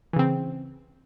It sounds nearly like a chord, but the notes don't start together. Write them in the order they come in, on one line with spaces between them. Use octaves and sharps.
E3 C#3 C4